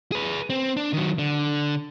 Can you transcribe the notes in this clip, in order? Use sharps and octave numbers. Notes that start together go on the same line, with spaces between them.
G#4 B4
C4
D4
D#3 F#3
D3